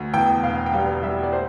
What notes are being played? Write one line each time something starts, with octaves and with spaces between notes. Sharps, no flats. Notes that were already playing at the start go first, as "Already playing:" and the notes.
Already playing: D2
E2 G5
E1 F5
G5
G3 F5
G3 E5
D5
C5